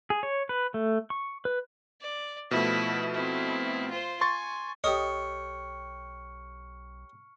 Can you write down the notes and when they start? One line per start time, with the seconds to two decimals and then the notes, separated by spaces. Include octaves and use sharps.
0.10 G#4
0.23 C#5
0.49 B4
0.74 A3
1.10 C#6
1.45 B4
2.01 D5
2.51 B2 F3 A3 E4 B4
3.14 C4 E4
3.91 F4 C5
4.21 G#5 C6 C#6 A6
4.84 B1 G4 A4 C#5 D#5 C#6 F6 C#7